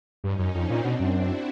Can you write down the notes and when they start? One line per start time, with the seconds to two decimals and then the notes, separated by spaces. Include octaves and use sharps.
0.24 G2 C#4 D#4
0.39 F#2
0.54 F2 C4 D4
0.70 A#2
0.84 B2 C4 D4
1.00 F#2
1.15 E4 F#4